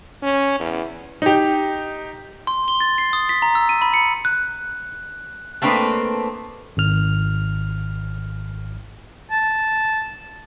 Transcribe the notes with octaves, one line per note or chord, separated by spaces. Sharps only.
C#4
E2
D#4 G4
C6
G7
A6
C7
D#6
B6
A#5
E6
D#7
B5
C#7
F#6
A3 A#3 C4 D4 B4 D#5
G#1 F6
A5